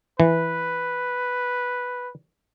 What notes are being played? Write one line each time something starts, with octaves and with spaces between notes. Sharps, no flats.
E3 B4